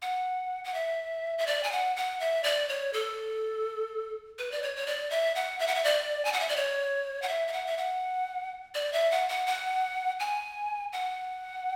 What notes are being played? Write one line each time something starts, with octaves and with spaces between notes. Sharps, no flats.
F#5
F#5
E5
E5
D5
G#5
F#5
F#5
E5
D5
C#5
A4
B4
D5
C#5
C#5
D5
E5
F#5
E5
F#5
E5
D5
G#5
F#5
E5
D5
C#5
F#5
E5
E5
F#5
E5
F#5
D5
E5
F#5
F#5
F#5
G#5
F#5